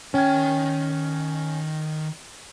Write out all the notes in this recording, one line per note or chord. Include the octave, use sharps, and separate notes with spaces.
D#3 C#4 G5 G#6